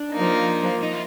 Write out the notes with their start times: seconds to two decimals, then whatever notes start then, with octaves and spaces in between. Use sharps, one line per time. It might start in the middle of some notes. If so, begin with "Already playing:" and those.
Already playing: D4
0.12 F3 A#3 D#4
0.82 D#4
0.92 F4